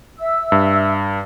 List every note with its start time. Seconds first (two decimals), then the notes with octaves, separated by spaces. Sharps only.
0.19 E5 E6
0.52 G2